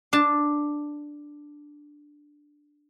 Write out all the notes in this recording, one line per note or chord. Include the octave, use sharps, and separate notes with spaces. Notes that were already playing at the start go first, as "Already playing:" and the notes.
D4 A5